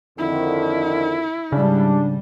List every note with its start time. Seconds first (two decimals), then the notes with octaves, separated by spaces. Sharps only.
0.18 F2 D3 D#3 E4
1.52 G#2 C#3 G3 D4